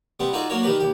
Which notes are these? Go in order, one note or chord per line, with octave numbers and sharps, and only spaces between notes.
G3 B3 C4
D#4 F4 F#4 G#4 A4 D5
F#3 A#3 D4 F#4 A#4 C#5
D#3 G3 G4 A#4 B4
D#2 G4